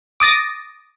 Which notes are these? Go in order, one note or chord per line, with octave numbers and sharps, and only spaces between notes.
D6 D#6 A6 A#6